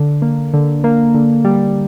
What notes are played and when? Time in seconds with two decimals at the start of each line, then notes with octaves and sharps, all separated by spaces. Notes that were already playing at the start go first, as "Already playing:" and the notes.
Already playing: D3
0.22 A#3
0.54 D3
0.84 A#3
1.15 D3
1.45 G3